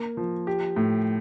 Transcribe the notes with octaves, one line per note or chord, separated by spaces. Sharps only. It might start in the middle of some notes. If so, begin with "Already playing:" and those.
Already playing: A#3 A#4
F3
G4
A2